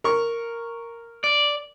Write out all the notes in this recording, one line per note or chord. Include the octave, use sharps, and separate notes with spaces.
A#4 C#6
D5